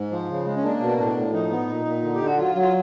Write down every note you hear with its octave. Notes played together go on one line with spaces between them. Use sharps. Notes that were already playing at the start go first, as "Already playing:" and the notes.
Already playing: G#2
F3
C#3
G#3
C#4
A#3 D4
B2
A2 D4
A2
F3 D#4
B3
A#2
A#2
D3
G4
D3
F#4
F#3 F4
F#3
F4